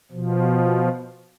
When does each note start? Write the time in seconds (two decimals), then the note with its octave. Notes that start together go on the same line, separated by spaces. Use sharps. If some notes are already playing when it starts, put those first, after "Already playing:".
0.12 B2 F3